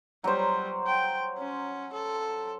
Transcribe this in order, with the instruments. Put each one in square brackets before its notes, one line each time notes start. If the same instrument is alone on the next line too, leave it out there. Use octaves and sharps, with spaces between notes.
[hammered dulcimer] F#3 C5 [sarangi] G3
[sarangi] G5
C#4
A4